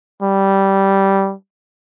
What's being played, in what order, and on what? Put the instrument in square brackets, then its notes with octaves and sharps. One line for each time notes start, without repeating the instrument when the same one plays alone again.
[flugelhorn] G3